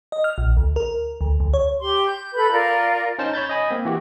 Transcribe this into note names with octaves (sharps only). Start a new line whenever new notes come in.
D#5
F6
A#1
D2
A#4
D2
D2
C#5
G4 C6
G6
A4 B4 B5 G6
F4 A#4 D5
C#4 D#4 C5 A5
C#5 B5 G6 A6
D#5 G#5 B5
A#3 C4
E3 F#4 G4